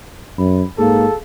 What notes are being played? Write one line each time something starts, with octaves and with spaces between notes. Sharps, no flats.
F#2 B5
G#2 A#3 G#4 A4 F5